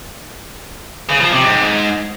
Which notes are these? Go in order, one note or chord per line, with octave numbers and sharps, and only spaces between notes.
C#3
F3
C3
G#2